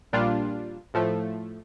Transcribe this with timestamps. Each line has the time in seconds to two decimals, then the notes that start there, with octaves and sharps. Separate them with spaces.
0.13 A#1 A#2 G3 D4 F4
0.94 A2 F3 A3